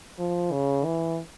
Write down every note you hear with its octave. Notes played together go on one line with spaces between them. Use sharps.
F3
C#3
E3